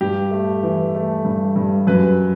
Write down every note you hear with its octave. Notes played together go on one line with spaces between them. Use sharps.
G2 G4
A3
E3
A3
G2
G2
F#2 B4